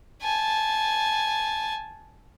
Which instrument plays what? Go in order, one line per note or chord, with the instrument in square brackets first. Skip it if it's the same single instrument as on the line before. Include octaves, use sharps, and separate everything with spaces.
[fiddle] G#5 A5